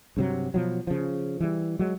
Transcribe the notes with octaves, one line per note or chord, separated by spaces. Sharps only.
G2 C3 F#3
B2 F3 F#3
C#3 F3
E3 G3
F#3 G#3